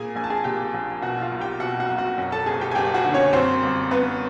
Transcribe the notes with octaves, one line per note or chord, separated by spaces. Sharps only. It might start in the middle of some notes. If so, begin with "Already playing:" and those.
Already playing: A#2 G#4 G#5
A#1 G#5
A5
G#4 G#5
A#2 G4 G5
A#1
B2 F#4 F#5
F4 F5
B1
G4 G5
B2 F#4 F#5
F#4 F#5
B1
F#4 F#5
F#2
A4 A5
F#1 G#4 G#5
G4 G5
G#5
F#1 G4 G5
F#4 F#5
D3
C#4 C#5
F#2 C4 C5
G1
G1 B3 B4